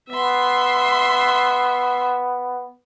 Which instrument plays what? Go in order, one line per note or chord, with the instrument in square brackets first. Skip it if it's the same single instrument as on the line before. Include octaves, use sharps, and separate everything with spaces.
[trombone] B3 [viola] E5 C6